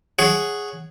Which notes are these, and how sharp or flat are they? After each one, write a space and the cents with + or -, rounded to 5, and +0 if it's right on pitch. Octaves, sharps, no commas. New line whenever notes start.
G#4 +0 C#5 +0 F#5 +0